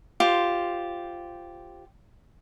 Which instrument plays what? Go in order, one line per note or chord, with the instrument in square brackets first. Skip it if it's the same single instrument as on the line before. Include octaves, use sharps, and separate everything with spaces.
[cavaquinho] F4 G4 C5